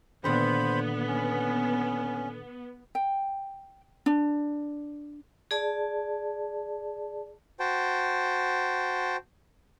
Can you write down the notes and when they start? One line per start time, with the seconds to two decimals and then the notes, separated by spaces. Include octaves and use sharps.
0.24 A#2 D3 D#3 B3 C5 B5
1.08 C#4
2.95 G5
4.06 D4
5.51 G#4 D5 A5
7.60 F#4 C5 G5 A5